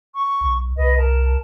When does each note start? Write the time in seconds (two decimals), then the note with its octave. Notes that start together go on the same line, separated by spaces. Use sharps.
0.14 C#6
0.41 B1
0.76 C2 B4 D#5
0.97 A#4 A5